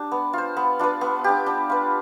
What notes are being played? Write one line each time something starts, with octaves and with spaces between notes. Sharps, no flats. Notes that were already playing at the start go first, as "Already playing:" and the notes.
Already playing: D4 G4
B3
F4 C5
B3
D4 F4 B4
B3
D4 G4
D4
F4 B4